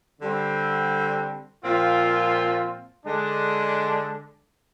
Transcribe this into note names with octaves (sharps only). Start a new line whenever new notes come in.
D3 G3 C4
A#2 F3 C4 F4
D3 G#3 D4